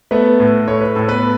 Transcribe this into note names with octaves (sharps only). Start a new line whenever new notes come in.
A3 B3 B4
A2
A2 C#5
B4
A2 A4
B3 B4